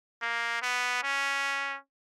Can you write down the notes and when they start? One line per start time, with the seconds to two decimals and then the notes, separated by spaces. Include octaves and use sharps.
0.22 A#3
0.62 B3
1.03 C#4